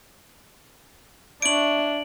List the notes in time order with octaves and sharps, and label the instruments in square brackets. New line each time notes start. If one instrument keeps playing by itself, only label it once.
[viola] D4 [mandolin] E4 C#5 [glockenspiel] D7 F#7